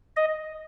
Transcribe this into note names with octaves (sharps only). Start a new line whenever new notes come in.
D#5